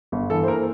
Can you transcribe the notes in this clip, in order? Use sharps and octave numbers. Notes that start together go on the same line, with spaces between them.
G1
E3 A4
C5
A#3 A#4